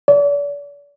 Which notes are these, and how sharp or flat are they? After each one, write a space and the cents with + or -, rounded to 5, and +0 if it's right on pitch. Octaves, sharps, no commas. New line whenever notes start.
D5 -40